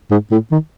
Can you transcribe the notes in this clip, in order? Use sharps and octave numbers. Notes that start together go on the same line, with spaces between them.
G#2
A2
D#3